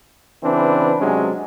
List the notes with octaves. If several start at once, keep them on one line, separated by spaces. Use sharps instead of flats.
C#3 E3 C4 D4 B4
C3 F#3 G#3 C#4 D4